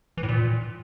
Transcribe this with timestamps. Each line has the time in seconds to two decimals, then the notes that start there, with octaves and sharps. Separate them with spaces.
0.17 E3
0.23 A2
0.28 A#2